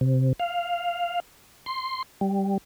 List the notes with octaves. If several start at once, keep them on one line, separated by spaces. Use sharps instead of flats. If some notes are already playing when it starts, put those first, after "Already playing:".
C3
F5
C6
G3